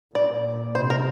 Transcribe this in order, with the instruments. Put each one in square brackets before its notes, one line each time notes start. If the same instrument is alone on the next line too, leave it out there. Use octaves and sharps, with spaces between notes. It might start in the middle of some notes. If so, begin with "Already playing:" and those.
[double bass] A#2 [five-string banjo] D5
[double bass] C3 [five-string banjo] C5
[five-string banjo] A#4